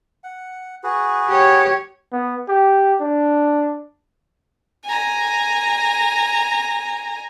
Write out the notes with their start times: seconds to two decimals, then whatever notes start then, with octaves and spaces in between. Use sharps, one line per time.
0.24 F#5
0.83 F#4 G#4 B4
1.28 G4 C#5
2.12 B3
2.48 G4
3.00 D4
4.85 G#5 A#5